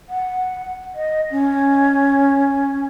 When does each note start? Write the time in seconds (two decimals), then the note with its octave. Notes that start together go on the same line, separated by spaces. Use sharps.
0.09 F#5
0.95 D#5
1.31 C#4